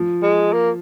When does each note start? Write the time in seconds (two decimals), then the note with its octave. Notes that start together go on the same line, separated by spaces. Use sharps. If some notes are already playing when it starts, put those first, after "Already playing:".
Already playing: F3
0.23 G#3
0.53 A#3